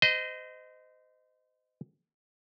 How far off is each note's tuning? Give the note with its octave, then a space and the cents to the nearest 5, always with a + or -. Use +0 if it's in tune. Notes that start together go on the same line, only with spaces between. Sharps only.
C5 -35 D#5 +0